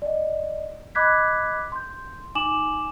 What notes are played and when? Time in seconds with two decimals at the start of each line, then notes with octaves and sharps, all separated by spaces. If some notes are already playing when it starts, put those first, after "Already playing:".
0.02 D5 D#5
0.95 D#5 B5 D6 F#6 G#6 B6
1.72 C6 G6
2.35 D#4 G#5 D6 E7 F#7